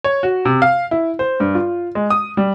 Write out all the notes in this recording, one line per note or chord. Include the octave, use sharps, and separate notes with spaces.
C#5
F#4
C3
F5
E4
C5
G2
F4
G#3
D#6
G3